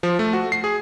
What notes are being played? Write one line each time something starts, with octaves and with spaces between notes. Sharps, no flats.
F3
A3
F#4
C7
G#4